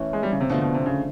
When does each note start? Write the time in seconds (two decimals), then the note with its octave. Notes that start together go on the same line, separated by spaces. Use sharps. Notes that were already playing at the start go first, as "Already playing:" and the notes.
Already playing: E3 A3 C#4
0.13 G#3
0.23 G3
0.32 C#3
0.40 C3
0.50 B2 D3 F3 A3 C4
0.61 B2
0.74 C3
0.86 C#3